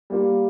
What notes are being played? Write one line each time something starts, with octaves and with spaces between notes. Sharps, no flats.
G3 A#3 F4